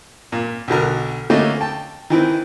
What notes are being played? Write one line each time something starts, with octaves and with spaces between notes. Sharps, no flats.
A#2
B1 B2 D3 A#4
D3 A3 A#3 C#4 D#4
G5 A5
D#3 E3 C4